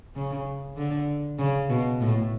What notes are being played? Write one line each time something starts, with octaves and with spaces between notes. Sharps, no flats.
C#3
D3
C#3
B2
A2